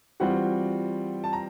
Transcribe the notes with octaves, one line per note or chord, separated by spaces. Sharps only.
E3 G3 C4 F4 F#4 F#5
A5
A#5